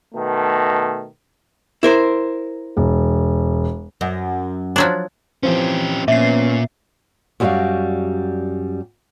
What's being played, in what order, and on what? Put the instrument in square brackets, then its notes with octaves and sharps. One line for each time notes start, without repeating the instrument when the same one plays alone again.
[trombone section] B2 D#3 A3
[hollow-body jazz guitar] E4 A#4 C5
[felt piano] E1
[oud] F#2
[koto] F3 F#3 D4
[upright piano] E3 F3 C4 [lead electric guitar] C#4 G4
[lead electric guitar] A#2 [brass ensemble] B3 C#4 [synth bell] E5 C7
[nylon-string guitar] F#2 G3 E4 F#4 D5 F5